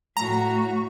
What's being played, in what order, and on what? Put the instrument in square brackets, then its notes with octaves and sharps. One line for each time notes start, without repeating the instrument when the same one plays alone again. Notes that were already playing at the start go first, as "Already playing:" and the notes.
[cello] A2 F#4 [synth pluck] A#5